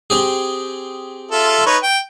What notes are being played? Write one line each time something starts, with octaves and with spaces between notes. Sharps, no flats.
C4 G4 G#4
F4 A4 E5
D#4 B4 C#5
G5